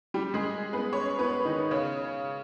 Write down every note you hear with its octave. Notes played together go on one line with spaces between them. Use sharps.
G3 G4
G#3 G#4
B3 B4
C#4 C#5
B3 B4
D#3 D#4
C#3 C#4